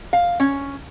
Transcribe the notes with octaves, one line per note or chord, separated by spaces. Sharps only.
F5
C#4